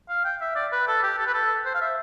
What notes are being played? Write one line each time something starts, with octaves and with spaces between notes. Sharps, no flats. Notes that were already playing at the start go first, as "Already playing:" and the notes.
F5
G5
E5
D5
B4
A4
G4
A4
B4
A4
C5
F5
E5